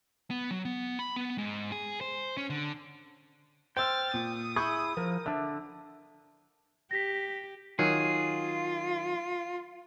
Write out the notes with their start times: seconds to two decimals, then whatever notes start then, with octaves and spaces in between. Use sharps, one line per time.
0.30 B3
0.51 F#3
0.65 B3
0.99 B5
1.16 B3
1.38 G#2
1.72 G#4
2.01 C5
2.37 C#4
2.50 D3
3.77 C5 G5 E6 F6 A6
4.14 A#2 D#6
4.56 E4 G#4 B5 C#6 G6
4.97 F3 A#4
5.26 D3 D4 E5
6.91 G4 A#6 B6
7.79 D#3 F#3 F4 G#4